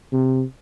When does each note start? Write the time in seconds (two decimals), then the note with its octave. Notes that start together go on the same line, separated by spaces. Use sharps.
0.13 C3